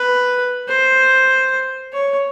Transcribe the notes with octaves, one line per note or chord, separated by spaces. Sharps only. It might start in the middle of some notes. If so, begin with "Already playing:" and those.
Already playing: B4
C5
C#5